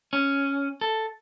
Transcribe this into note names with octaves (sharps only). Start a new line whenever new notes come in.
C#4
A4